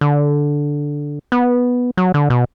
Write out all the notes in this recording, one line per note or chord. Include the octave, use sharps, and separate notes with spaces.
D3
B3
F#3
D3
B2